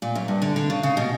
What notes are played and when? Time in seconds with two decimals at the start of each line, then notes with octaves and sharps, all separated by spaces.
0.02 A#2
0.15 F#2
0.28 G2
0.42 D3
0.56 D3
0.70 C#3
0.83 C#3
0.97 B2